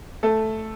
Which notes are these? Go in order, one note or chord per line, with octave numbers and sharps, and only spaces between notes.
A3 A4